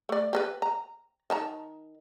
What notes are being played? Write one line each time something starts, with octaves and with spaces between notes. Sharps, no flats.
A3 D5
G4 A4 B4
A#5
D#3 A5 A#5